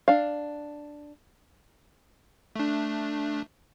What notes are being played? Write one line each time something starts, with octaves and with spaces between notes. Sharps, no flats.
D4 F5
A3 D4